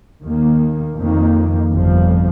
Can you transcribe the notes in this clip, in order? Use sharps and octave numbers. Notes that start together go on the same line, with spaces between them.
D#2 D#3 A#3
F2 D#3 A#3
G1 F2 C3 F3